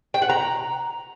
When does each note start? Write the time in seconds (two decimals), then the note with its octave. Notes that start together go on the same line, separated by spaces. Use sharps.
0.14 G5
0.22 F#5
0.30 A#5